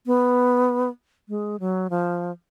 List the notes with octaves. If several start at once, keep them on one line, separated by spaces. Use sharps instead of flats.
B3
G#3
F#3
F3